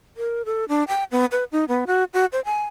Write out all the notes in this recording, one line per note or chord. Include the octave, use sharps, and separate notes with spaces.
A#4
A4
D4
G5
B3
B4
D#4
B3
F#4
F#4
C5
G#5